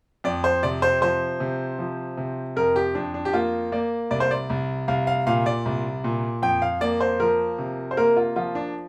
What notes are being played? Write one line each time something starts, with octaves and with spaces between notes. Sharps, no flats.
F2 D5
C5
C3 D5
C5
F3 C5
C3
F3
C3
F2 A#4
G4
F2 D4
D4
G4
A#3 F4
A#3 D5
C2 D5
C5
D5
C2
C2 F5
F5
A#2 F5
D5
C2
A#2
F2 G5
F5
A#3 D5
C5
F3 A#4
C3
C5
A#3 A#4
F4
F3 F4
D4